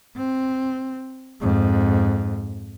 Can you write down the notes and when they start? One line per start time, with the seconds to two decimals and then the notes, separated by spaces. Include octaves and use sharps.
0.17 C4
1.41 F2 G#2